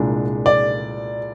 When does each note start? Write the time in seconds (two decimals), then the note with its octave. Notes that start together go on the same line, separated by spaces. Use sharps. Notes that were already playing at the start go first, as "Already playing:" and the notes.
Already playing: C2 A#2 G#3 D4
0.46 D5